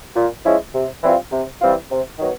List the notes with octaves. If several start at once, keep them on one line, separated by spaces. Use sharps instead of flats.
A#2
F3 G#3 C#4 E4
C3
E3 G3 C4 F4
C3
E3 G3 C4 F4
C3
D#3 F#3 B3